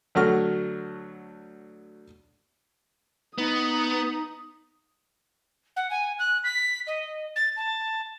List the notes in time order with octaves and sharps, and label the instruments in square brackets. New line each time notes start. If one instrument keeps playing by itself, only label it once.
[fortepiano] D2 F#3 A3 F#4 C#6 F6
[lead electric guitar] B3 [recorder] D#4 [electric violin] D#6
[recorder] F#5
G#5
F#6
B6
D#5
A6
A5